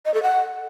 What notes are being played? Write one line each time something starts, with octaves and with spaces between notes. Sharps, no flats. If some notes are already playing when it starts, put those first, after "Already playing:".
D#5
A4
F#5